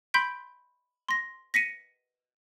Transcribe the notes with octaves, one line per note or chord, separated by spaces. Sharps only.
B5 C6 G6 B6 D7
C6 A#6
A#6 B6 C#7 D#7